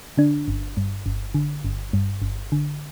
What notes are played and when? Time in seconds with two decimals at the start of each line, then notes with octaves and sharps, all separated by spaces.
0.17 D3 D4
0.48 G1
0.77 G2
1.06 G1
1.34 D3
1.64 G1
1.93 G2
2.22 G1
2.52 D3